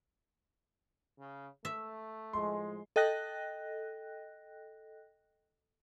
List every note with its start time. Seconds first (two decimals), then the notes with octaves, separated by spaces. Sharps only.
1.18 C#3
1.65 A3 E5
2.33 A2 F3 G#3 C6
2.96 A4 D#5 G5 F#6 A#6